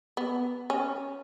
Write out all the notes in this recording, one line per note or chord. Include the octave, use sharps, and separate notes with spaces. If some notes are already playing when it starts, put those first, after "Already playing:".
B3
C#4